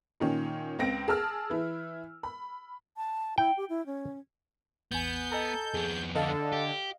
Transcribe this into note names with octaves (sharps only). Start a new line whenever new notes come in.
A#2 D#3 C#4
C#2 C4 A#6 D7
G#4 A5 E6 F6
E3 E4
B5
A5
E4 G5
G4
E4
C#4
A1 E2 B3 G#5 G6
A4 D#5 G#5 A#5
F2 B3 G#4
D3 A4 D#5 F5
G4